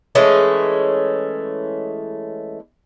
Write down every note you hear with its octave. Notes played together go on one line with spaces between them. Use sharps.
E3 G#3 A3 C#4